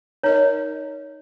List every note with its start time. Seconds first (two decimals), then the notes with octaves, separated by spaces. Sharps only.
0.23 D#4 A#4 C#5 D#5